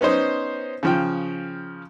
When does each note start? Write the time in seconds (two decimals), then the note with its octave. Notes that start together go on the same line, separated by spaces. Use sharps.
0.01 B3 C#4 D#4 C5
0.83 C#3 F3 G5